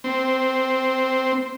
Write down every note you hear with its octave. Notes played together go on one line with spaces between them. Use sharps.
C4